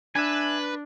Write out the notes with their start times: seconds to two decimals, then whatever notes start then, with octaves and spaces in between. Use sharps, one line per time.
0.15 D4 B4 E5 G#5